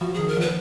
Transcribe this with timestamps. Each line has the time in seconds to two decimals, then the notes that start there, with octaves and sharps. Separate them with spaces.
0.01 F3 F#4
0.14 D#3 G#4
0.28 A#4
0.36 F3 B4